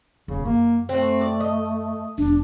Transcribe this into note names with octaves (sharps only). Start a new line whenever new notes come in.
D#1 E2 C#3
F#2 A#3
A3 C4 F#4
D5
D#5
E1 D4